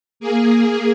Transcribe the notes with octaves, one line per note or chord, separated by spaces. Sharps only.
A#3 G#4